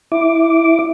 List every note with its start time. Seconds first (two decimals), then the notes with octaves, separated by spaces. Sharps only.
0.12 E4 D6